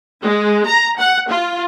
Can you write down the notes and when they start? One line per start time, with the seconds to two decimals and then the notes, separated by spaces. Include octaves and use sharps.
0.21 G#3
0.66 A#5
0.98 F#5
1.29 F4